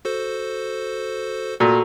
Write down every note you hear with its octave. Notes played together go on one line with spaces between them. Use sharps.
F#4 A4 C5
A#2 F#4 A4 A#5